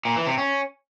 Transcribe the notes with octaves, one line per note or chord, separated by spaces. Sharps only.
A#2
E3
C3
C#4